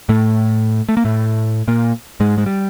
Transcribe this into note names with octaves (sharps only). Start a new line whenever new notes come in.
A2 A3
A3
A#3
A2 A3
A#2 A#3
G#2 G#3
G#3
G3